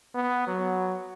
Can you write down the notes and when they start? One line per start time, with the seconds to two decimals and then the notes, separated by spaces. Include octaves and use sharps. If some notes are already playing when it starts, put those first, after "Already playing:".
0.14 B3
0.47 F#3